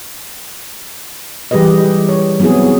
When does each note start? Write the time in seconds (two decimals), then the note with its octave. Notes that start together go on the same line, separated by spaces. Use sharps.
1.51 E3 G3 G4 G#4 B4 D#5
2.09 C#5
2.40 F#3 B3 C4 E4 G#4